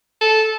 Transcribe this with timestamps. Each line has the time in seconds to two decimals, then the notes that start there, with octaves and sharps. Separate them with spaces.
0.21 A4